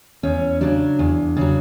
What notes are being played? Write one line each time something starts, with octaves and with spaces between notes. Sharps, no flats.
E2 C#4
C#3 F#3 D4
E2
C#3 F#3